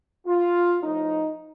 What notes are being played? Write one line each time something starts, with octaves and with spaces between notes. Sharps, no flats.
F4
A2 F3 D#4